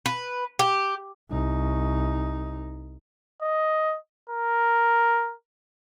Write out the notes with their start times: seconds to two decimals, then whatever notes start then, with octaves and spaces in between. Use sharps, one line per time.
0.06 B4
0.59 G4
1.31 C2 D#4
3.42 D#5
4.30 A#4